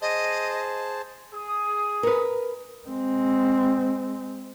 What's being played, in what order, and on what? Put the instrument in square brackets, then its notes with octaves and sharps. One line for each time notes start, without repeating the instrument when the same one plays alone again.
[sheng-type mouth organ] G#4 C5 A5 [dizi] D#5
[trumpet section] G#4 D#6
[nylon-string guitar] A#4 B4
[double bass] G#3 C4